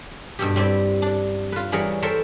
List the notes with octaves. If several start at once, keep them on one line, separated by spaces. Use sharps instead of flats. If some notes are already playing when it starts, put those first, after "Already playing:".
G2 B2 G4
G3 C4 E4 G4
D4
F4 B4
E3 G3 G#4 A#4 C#5
A4 A#4 C5 C#5 E5 G5